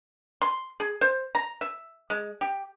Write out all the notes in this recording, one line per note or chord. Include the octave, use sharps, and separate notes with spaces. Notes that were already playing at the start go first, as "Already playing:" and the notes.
C6
G#4
C5
A#5
E5
G#3
G4